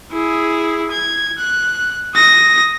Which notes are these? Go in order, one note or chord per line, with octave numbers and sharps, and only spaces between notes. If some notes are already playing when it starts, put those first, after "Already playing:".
E4 G#4
G#6
F#6
D#6 A#6